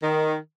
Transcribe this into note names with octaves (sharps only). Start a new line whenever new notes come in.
D#3